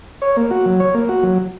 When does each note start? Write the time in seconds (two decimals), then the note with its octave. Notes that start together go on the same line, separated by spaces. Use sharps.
0.22 C#5
0.37 A#3
0.51 F#4
0.66 F#3
0.80 C#5
0.94 A#3
1.09 F#4
1.23 F#3